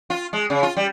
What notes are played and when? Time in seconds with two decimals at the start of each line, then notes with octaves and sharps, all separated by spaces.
0.10 F4
0.33 G#3
0.50 C#3
0.63 F4
0.76 G3